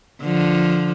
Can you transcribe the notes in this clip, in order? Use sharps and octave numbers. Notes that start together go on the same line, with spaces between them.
D3 F3